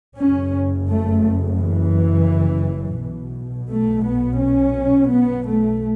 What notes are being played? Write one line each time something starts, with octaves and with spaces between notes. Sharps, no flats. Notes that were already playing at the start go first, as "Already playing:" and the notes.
F#1 F#2 C#3 C#4
A3
E3
B1 B2
A3
B3
C#4
B3
A3